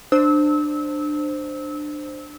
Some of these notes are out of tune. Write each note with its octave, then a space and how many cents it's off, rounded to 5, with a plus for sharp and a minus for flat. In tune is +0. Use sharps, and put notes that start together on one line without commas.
D4 +20 C5 +0 E6 -30